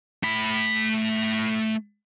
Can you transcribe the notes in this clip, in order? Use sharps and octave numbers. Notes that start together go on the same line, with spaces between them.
A3 B5